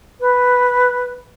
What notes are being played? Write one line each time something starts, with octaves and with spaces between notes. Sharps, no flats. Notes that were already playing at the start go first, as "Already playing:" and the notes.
B4